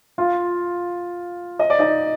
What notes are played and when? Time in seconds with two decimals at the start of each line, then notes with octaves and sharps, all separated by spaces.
0.18 F4 F5
1.59 D#5
1.70 D5
1.79 D#4 D#5